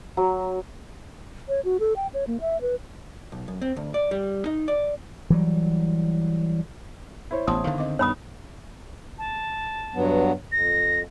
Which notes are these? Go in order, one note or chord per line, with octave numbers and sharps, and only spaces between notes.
F#3
C#5
F#4
A4
G5
C#5
A#3
E5
B4
B1
F#2
C4
D2
D5
G3
D#4
D5
E3 F#3 G3
E4 C5 C#5
A1 B3 A5 C6 D#6
D3 D#3 F5
C4 D#5 D6
G2 D#3 B3 D#4 C#5 B5 D#6
A5
G2 F#3 B3
F2 A#6